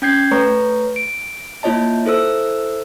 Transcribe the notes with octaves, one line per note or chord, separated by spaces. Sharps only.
C#4 G5 G6 G#6 C7
A3 B4 C#5 A#5 C#6
D7
A#3 E4 F4 C#5 D#5 A5
E4 A4 C5 E6